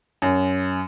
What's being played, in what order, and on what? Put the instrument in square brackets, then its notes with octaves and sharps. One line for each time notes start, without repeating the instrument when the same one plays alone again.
[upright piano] F#2